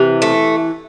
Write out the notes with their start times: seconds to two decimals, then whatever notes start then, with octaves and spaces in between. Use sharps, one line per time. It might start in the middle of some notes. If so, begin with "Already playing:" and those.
Already playing: C3 E3
0.22 A3